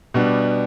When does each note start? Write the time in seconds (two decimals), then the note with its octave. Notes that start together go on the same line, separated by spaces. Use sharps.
0.14 B2 G3 B3 D4